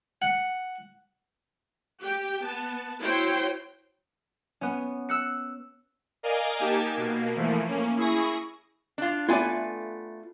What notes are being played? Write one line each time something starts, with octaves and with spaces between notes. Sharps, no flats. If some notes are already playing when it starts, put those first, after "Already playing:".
F#5
G4 G5
B3 A5
E4 F#4 C5 C#5 G5 C6
B3 C#4
E6 F#6 C#7
A#4 D5 D#5 F5 G#5
A#3 D#4 G4 G#5 A5
B2 A#3
E3 F3 A3 A#3
A#3 C#4
E4 G#4 C#6 A#6
D4 F4
A3 B3 F4 D5 G#5